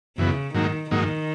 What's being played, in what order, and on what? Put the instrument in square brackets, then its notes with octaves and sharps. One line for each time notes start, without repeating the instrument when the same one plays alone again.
[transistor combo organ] F#2 E3 B3 [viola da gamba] C#3
[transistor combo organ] G#2 F#3 A#3 D#4 [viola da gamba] D#3
[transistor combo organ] G#2 F#3 A#3 D#4 [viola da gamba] D#3